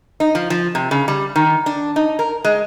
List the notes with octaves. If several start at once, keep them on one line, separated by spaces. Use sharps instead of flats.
D#4
F3
F3
C3
C#3
G3
D#3
D4
D#4
A#4
G#3